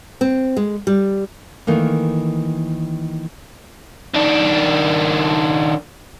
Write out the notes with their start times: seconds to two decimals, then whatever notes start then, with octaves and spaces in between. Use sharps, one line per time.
0.21 C4
0.57 G#3
0.87 G3
1.67 D#3 E3 A3 A#3
4.14 D#3 D4